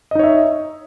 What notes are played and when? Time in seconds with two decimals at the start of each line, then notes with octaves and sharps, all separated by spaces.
0.11 D#5
0.15 D#4
0.19 C#5
0.24 E5